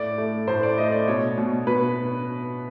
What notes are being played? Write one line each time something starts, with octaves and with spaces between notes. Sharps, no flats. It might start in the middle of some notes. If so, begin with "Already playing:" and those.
Already playing: A2 D5
A3
A2 C5
D5
A3 D#5
D5
B2 C#5
B2
B2 B4